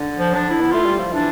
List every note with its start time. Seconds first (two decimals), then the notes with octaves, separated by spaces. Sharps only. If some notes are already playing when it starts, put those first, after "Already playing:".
Already playing: D3
0.18 F3
0.34 D4
0.50 E4
0.61 B3
0.70 A3 F4
0.86 G3
0.99 F3
1.13 E3 D4